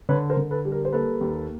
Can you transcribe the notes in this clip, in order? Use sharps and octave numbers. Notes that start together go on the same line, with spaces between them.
D3 B4 C#5
A#4 C5
D3
A4 B4
G3
A#4
C5
A#3 A4 B4
D#2